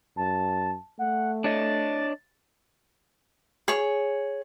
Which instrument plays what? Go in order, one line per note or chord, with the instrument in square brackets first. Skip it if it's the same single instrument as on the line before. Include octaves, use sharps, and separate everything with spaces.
[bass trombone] F#2 [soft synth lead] A5
[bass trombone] A3 [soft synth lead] F#5
[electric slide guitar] D4 C#5 D#5 [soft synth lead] A6
[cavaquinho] G#4 C#5